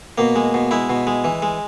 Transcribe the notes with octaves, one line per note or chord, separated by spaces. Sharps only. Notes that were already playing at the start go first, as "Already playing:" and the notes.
B2 A#3
G#3
B2
G#3 E4
B2
G#3
E3
G#3